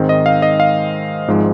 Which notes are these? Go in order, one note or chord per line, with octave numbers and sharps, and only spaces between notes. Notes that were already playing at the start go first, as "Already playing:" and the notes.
Already playing: G#2 D#3 G#3 C4
D#5
F5
D#5
F5
G#1 G#2 F3 G#3